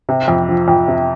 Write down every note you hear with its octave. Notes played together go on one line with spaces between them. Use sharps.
C3
F2
F3
F2
C3